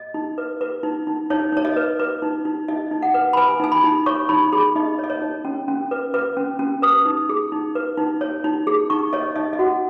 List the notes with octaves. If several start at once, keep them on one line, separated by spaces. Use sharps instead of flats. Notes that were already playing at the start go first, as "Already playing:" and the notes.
Already playing: D#5
D#4
B4
B4
D#4
D#4
D#4 C#5
D#4 C#5
D#5
B4
B4
D#4
D#4
D#4 D#5
D#4
F#5
B4
B5
B4 G#5
D#4 G#5
B5
D#4
C#5 C#6
D#4 B5
G#4 B5
D#4 D#5
C#5
D#5
C#5
D#4
C#4
C#4
B4
B4
C#4
C#4
B4 D#6
D#4
G#4
D#4
B4
D#4
C#5
D#4
G#4
D#4 C#6
C#5 D#5
D#4 D#5
D#5
F#4 F#5